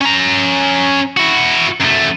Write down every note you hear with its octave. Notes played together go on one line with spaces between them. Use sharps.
C#4 A#5
E4 F#4
F#2 A3